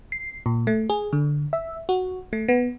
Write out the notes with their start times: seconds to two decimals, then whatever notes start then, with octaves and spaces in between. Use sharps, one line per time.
0.12 C7
0.46 A#2
0.67 A3
0.90 G#4
1.13 D3
1.53 E5
1.89 F#4
2.33 A3
2.48 B3